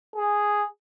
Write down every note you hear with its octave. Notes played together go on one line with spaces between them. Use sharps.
G#4